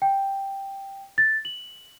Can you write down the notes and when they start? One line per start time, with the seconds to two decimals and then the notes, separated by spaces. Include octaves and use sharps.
0.02 G5
1.18 A6
1.45 F#7